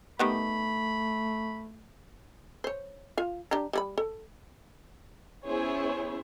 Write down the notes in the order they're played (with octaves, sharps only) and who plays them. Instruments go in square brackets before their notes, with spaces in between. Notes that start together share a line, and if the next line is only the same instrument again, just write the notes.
[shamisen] D#3 G3 B3 [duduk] A3 [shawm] B5
[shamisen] C5 C#5
F4 F5
D4 G4 A#5
G3 G4 B5
A4
[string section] B3 C#4 E4 G#4 C5 C#5